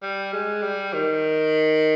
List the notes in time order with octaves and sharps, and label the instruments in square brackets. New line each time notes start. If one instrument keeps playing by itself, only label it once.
[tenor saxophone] G3
G#3
G3
D#3